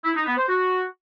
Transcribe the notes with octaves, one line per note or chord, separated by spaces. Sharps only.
E4
D#4
B3
C5
F#4